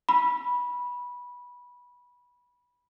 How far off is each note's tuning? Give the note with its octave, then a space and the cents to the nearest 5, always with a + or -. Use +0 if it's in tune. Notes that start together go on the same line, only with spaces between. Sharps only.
B5 -15